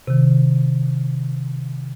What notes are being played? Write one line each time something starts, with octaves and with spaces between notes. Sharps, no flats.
C3 D#3